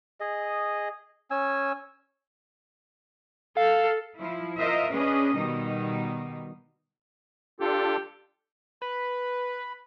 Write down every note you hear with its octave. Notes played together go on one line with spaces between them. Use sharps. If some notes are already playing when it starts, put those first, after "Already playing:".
G#4 D#5
C#4 G#5 E6
A4 F5
F3 E4
F4 A#4 C5 D#5 E5
C#4 D4 G#4 B4 D#5
B2 D#3 G3 D#4
D4 F4 G4 A4
B4 B5